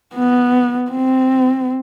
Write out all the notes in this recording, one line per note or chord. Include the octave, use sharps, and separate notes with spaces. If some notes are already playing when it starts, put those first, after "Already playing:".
B3
C4